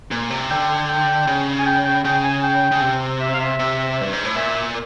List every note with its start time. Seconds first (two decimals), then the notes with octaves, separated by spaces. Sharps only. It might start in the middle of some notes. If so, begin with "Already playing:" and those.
0.11 A#2
0.30 C3
0.50 D3 G5
0.88 G5
1.27 C#3
1.58 G#5
1.66 G5
1.85 G5
2.05 C#3 G5
2.24 G#5
2.43 G5
2.71 C#3
2.82 C3
3.20 E5
3.34 F5
3.40 E5
3.59 C3
4.01 G2
4.13 G#2
4.25 A2
4.36 A#2 E5